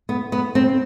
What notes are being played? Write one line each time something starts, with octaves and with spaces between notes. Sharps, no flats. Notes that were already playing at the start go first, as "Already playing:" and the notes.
B3
B3
C4